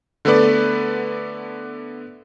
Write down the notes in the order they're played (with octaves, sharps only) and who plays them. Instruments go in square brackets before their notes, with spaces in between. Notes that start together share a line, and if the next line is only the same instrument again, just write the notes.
[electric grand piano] D3 A3 B3 A4 B4 D5